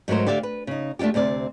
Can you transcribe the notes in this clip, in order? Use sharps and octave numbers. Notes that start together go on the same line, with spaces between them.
G#2 F#3 A3 A#4 C5
D3 G4 D5 E5 F5
B4
C#3 D#4
A3 D4 D#4 F4 G4
D2 C3 C4 D5